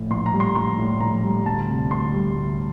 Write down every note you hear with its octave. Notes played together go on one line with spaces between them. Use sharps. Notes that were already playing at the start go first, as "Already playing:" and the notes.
Already playing: A#1 A2
A#1 C6
A#5
G3
C6
A#1 C6
A2
A#1 A#5
G3
D2 A5
C3
D2 C6
G3
D2